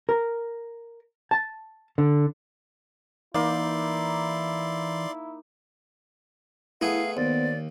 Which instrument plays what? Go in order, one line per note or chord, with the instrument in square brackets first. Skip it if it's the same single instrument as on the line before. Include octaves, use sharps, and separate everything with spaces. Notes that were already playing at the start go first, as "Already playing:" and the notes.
[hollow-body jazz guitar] A#4
A5
D3
[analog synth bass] E3 [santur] A#3 D#4 A#4 [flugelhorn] E4 [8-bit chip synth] D5 C6
[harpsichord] A3 B3 G#4 [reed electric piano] E4 [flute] F5
[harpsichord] D#2 [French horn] B3 [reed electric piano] C5 [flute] D5